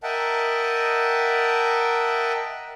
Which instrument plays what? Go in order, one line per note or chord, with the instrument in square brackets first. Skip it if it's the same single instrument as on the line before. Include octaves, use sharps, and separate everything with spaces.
[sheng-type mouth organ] A#4 D#5 E5 F#5 G5 A5